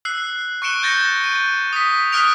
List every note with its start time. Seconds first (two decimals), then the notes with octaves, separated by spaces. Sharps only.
0.05 E6 F#6 C7
0.62 C#6 F#6 C#7 D7 E7 G7
0.83 G6 A6 A#6 C#7
1.24 D#7
1.73 D#6 B6
2.12 D#6 F6 F#6 B6 D7 F7